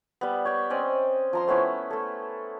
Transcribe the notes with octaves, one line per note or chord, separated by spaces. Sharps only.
G3 B3
C#5 G5
C4 C#4 D5 D#5
F3 A#5 C6
A3 B3 C#4 E4
A3 A4